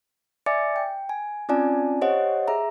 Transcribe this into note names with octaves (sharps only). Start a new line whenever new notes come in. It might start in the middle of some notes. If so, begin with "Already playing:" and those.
D5 E5 G#5 D6 A6 C#7
G5
G#5
C4 C#4 F4 D5 G#5 A5
G4 C5 C#5 D#5 F#5
G#4 E5 A#5